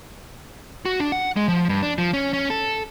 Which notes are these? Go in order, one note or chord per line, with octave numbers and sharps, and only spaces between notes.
F#4
D4
F#5
G#3
F3
G2
D4
F3
C#4
C#4
A4